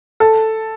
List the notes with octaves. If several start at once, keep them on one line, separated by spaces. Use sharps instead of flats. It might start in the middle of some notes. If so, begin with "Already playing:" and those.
A4